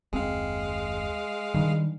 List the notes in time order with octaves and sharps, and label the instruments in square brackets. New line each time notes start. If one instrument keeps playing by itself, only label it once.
[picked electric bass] F#1 D#2 C4 [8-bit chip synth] G#3 F5
[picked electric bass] D#3 G3 D4